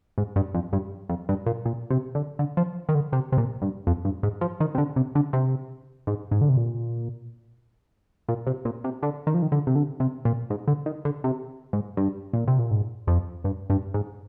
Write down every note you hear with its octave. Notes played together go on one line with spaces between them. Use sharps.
G#2
G2
F2
G2
F2
G2
A#2
A#2
C3
D3
D3
F3
D#3
D3
C3
C3
A#2
G2
F2
G2
G#2
F3
D#3
C3
D3
C3
D3
C3
G#2
G#2
D3
C3
A#2
A#2
C3
A#2
C3
D3
D#3
F3
D#3
D3
C3
D3
C3
A#2
G#2
D3
D#3
D3
C3
G#2
G2
A#2
C3
A#2
G#2
F2
G2
G2
G#2